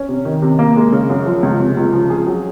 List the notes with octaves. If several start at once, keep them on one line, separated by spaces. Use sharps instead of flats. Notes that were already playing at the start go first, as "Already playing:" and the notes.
Already playing: C#4
C3
D#3
C3
A#3
G#3
C#3
F#2
F3
C#2
C3
C#2
F3
G#4
F#3